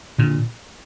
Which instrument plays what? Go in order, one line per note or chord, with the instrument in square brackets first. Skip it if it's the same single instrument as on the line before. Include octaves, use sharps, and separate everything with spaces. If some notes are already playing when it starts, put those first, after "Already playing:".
[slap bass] A#2 D3